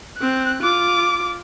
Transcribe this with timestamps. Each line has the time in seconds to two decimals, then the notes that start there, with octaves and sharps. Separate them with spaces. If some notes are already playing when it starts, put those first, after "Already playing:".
0.18 C4 F#6
0.63 F4 D6